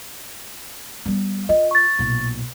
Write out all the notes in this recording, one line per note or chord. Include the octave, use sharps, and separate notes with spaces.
G3 B3
F4 D#5
C#6 A6
B1 A#2